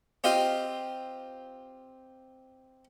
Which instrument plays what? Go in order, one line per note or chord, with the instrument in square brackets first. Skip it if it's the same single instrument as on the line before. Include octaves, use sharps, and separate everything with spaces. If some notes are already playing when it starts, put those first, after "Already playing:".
[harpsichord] C4 F4 G4 D#5 F5 G5